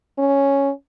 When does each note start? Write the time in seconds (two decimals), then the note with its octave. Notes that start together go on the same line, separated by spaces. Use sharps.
0.19 C#4